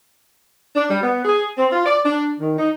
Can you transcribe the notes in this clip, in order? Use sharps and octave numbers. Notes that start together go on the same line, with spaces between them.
D4
G3
B3
G#4
C4
F4
D5
D4
D#3
D#4